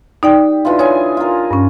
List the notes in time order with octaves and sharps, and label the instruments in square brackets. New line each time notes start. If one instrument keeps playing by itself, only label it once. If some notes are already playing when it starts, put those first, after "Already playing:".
[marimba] D#4 D5 G5 [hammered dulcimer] G4
[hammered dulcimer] D3 E3 F4
[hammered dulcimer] G#4 G#5 [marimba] C#5
[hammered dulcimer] F4 A#4
[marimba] G2 C#4